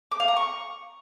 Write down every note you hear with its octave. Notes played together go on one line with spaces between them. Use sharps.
D6
F5
A#5
C#6